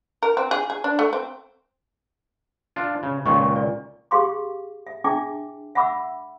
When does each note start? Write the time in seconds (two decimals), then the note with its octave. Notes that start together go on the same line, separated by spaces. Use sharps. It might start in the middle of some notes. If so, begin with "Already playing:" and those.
0.23 A#4
0.37 C4
0.51 G#4
0.70 G#4
0.84 D4
0.99 A3
1.13 C4
2.76 D4 F4
3.03 C#3
3.26 C#2 A#2 D#3 C#6
3.56 D5
4.11 G4 G#4 F5 C6 D6
4.87 E5
5.04 D4 E4 G#4 E5 G5 D6
5.75 E5 F#5 B5 D6 E6